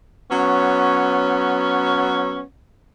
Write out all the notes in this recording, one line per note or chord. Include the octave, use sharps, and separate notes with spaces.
F#3 B3 C#4